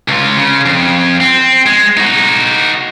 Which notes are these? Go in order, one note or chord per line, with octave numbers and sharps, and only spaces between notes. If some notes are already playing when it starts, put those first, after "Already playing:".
C#2 F4
C#3
F2
C4
G#3
D#4 F#4